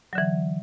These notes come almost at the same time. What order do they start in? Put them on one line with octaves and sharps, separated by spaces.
F#3 D3 E3